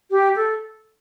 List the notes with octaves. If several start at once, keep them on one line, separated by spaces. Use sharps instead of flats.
G4
A4